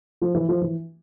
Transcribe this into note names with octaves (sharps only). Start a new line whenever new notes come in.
F3
E3
F3
E3